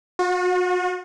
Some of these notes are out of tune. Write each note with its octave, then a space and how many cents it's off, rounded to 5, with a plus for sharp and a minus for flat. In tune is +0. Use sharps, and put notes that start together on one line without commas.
F#4 -40